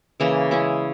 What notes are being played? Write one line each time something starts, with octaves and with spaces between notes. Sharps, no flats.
C#3 E3 A#3 E4
G#3 C#4 E4